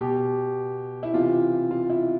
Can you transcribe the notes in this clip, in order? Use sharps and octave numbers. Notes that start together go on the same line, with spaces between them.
B2 G4
E4
C3 E3 F4
F4
E4